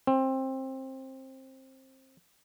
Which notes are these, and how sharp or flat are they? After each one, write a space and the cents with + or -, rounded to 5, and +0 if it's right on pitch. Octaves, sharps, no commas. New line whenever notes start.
C4 +20